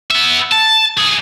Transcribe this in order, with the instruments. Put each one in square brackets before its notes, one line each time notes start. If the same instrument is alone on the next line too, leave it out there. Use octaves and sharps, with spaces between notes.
[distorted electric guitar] B3 E5
A5
B1 G#4